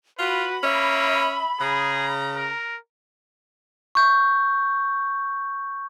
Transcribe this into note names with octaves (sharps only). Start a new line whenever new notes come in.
F4 F#4 B4 B5
A#3 C#4 E5
C#3 G#4 A#5
A#4
C#6 G6